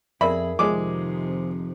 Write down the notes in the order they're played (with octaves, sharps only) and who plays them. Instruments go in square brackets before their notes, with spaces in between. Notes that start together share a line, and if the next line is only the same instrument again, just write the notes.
[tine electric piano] F2 [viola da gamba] G#4 [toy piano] A#4 D5 E5 [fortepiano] B5
[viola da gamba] F2 C3 D#3 [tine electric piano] F3 [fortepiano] G#3 D6